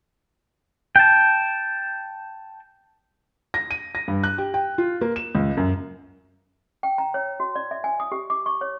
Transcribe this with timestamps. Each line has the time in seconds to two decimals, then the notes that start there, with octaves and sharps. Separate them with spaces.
0.96 G5 A5
3.54 A#6
3.71 D#7
3.95 A#6
4.08 G2
4.24 F#6
4.38 G4
4.54 G5
4.78 F4
5.01 A#3
5.16 E7
5.35 C#2
5.57 F#2
6.83 G5
6.98 A#5
7.14 C#5
7.40 F#4
7.55 D5
7.71 E5
7.84 G#5
8.00 D#6
8.12 G4
8.30 D6
8.46 C#6
8.61 C#5